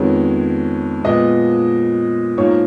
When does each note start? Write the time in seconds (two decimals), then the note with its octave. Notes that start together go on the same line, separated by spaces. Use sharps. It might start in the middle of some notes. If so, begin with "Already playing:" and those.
Already playing: F2 D#3 G#3 B3 C#5
1.04 A#2 F3 G#3 B3 D#5
2.37 G#2 F3 A#3 C#5